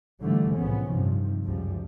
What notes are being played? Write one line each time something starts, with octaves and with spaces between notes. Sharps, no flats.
G#2 D3 E3 F3 G3 A3
C2 A2 C#3 F3 B3 C#4
G2 C3 D#3 F3
C#2 F#2 F3 G3